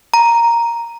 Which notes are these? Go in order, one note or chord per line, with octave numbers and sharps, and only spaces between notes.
A#5